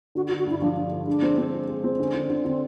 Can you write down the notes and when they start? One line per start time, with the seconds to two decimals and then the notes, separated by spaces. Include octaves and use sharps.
0.15 D3 F#4
0.28 F#4
0.31 D3
0.38 F#4
0.46 G2 E4
0.62 F3 D4
0.77 G2
0.92 D3
1.07 G#3 D4
1.22 C4
1.38 C4
1.53 G#3
1.68 G#3
1.84 C4
1.98 D3 C#4
2.14 D3
2.30 D3
2.45 D3 C4